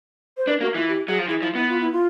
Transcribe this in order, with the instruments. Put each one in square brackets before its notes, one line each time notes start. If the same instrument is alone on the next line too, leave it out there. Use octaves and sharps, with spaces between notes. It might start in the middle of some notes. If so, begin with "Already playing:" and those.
[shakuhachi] C5
[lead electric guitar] D4 [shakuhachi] B4
[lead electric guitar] A#3 [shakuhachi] F#4
[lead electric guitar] E3 [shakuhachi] F4
[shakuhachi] G4
[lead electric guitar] F#3 [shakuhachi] G#4
[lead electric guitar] F3
[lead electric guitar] E3 [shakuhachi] G#4
[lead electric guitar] F3 [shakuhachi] E4
[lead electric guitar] B3 [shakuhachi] E4
[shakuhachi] F4
E4
F4